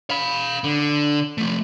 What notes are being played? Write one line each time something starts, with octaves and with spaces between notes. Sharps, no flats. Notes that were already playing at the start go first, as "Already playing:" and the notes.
F5 B5
D3
F3 A3